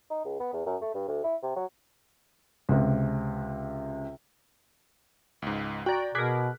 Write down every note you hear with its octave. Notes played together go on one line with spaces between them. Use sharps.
D#4
C#2
B3
E2
F#2
A3
G2
D2
E4
C3
F#3
C#2 C3
C#2 G#2
F#4 D5 G5 A#5
B2 G#4 A#4 D6 F#6 B6